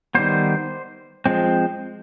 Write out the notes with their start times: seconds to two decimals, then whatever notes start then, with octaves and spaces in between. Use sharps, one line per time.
0.15 D#3 G3 B3 C5
1.26 F3 G#3 C4